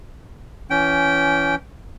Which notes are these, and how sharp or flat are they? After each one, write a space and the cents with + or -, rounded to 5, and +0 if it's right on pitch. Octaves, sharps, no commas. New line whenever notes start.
E3 +25 C#4 +20 G5 -15